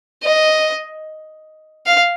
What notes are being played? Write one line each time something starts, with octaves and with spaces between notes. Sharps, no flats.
D#5
F5